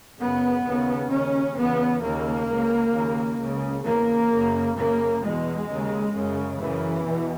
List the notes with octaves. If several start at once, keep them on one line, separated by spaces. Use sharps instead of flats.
F#2 C#3 B3
D#2 C#3
D#2 C#3 C#4
E2 C#3 B3
D#2 C#3 A#3
C#2 C#3
D#2 C#3
C#2 C#3
E2 C#3 A#3
F#2 C#3
F#2 C#3 A#3
E2 B2 G#3
D#2 C#3
F#2 C#3
F#2 C#3 E3
E2 B2